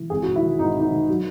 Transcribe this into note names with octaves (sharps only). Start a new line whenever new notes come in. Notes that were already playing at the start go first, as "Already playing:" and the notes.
Already playing: E3
G#1 G#4
G#2 F#4
E4
D#3
G#2 D#4
G#1 D#4
D#3
F#3